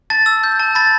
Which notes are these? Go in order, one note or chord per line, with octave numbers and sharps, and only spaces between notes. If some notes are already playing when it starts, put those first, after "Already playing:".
A5 A6
E6
G6
A5
B5 A6